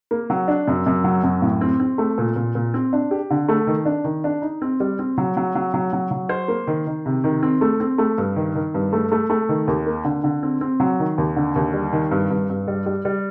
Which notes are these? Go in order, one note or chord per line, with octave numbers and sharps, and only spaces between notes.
A#3
F#3
D4
F#2
F#2
F#3
F#2
A2
C4
C4
A3
A#2
A#2
A#2
C4
D4
G4
D3
A3
D#3
D4
D#3
D4
D#4
C4
G3
C4
F#3
F#3
F#3
F#3
F#3
F#3
C5
A#3
D#3
D#3
C3
D#3
C4
A3
C4
A3
G2
D#3
D#3
G2
A3
A3
A3
D#3
D#2
A#3
D3
D3
C4
C4
F#3
D#3
D#2
D3
D#2
G3
D#3
G2
G2
G2
G3
G3
G3